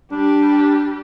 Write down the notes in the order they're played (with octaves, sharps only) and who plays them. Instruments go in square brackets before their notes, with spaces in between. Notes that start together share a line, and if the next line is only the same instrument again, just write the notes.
[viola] G3 G4 [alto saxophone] D4